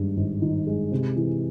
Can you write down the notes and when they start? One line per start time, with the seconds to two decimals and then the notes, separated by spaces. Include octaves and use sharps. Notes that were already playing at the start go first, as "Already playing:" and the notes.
Already playing: G2 D#3 G#3
0.17 G#1
0.42 D#3
0.67 G#3
0.92 C3
1.16 E3